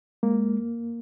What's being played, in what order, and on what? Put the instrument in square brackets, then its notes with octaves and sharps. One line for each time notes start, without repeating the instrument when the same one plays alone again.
[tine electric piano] G#3 [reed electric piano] A#3